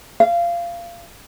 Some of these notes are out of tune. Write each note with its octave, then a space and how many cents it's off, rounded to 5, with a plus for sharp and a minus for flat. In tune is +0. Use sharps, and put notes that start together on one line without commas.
F5 -20